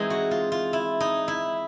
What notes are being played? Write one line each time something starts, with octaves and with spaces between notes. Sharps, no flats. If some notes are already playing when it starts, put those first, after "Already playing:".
Already playing: E3 G#3 C4 D#4
F#4
F4
F4
E4
D#4
E4